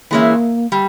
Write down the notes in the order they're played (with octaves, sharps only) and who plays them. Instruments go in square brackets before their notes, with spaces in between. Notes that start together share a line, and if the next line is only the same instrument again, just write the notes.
[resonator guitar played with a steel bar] E3 G#3 C#4 E4 [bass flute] A#3
[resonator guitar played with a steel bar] G3